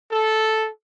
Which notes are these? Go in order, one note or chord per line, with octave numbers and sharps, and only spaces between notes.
A4